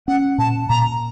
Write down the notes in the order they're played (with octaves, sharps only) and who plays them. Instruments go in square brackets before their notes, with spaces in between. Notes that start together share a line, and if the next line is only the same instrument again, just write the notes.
[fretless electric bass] C#4 [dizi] F#5
[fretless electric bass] A#2 [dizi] A5
[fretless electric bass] A#2 [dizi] A#5